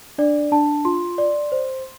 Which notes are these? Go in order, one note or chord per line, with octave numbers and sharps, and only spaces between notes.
D4 D5
D4 A5
F4 C6
D5
C5